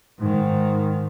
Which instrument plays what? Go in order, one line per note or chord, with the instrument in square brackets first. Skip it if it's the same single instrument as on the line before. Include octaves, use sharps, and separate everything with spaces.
[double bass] G#2 D#3